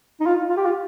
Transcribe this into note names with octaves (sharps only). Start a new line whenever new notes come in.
D#4
F4
F4
G4
F4